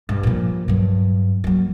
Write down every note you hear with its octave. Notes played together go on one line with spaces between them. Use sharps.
G2
A#2 F3
G2 F#3
F#3 A#3